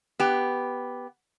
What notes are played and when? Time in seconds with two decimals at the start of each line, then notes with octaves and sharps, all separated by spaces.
0.20 B3 G4